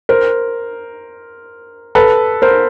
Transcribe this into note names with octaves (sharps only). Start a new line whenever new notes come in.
A#4 C5
A4 B4
A#4 C5